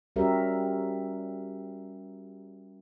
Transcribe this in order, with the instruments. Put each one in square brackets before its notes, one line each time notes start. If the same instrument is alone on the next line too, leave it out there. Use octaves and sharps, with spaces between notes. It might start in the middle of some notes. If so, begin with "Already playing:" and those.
[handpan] G3 C#4 F#4 G4 A#4 E5